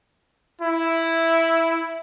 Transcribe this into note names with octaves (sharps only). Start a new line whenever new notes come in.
E4